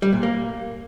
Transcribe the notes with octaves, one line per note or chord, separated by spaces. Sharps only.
G3
A#2
A#3